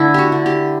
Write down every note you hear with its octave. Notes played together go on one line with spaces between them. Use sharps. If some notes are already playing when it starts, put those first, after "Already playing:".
Already playing: D3 A3 D4 E4
F#4 G4
D3
G4